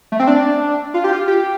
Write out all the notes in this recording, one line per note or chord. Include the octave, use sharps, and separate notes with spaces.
A3
C4
D4
F4
G4
F4
G4